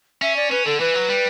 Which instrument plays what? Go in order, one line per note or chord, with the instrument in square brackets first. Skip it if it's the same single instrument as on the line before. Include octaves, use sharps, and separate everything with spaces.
[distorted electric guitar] C#4 [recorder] E5
[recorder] D5
[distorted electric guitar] C#4 [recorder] B4
[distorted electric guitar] D3 [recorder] A4
[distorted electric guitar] E3 [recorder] B4
[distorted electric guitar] F#3
G3